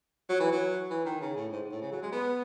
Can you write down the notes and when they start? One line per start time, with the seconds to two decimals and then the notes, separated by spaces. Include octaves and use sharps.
0.29 F#3
0.40 E3
0.52 F#3
0.90 E3
1.05 D#3
1.21 C#3
1.36 A2
1.52 G#2
1.72 A2
1.82 C#3
1.92 F#3
2.02 G#3
2.12 B3